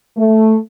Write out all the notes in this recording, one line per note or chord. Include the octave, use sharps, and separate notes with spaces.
A3